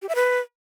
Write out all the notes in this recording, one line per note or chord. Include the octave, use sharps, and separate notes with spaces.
G4
E5
B4